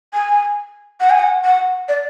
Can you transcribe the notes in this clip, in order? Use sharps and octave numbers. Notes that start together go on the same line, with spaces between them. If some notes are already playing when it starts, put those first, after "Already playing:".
G#5
F#5
G#5
F#5
F#5
D5